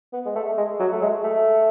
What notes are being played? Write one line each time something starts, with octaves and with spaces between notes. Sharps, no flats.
B3
G#3
A3
G#3
F#3
A3
G#3
A3